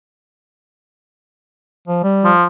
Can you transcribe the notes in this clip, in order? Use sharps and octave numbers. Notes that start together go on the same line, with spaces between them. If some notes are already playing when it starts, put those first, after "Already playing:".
F3
G3
F3